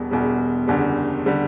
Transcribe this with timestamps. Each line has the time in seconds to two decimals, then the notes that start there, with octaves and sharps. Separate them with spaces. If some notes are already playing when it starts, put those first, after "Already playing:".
Already playing: E1 E2 B2 G3
0.11 E1 E2 B2 G3
0.67 F#1 E2 D3 G3
1.26 D3 G3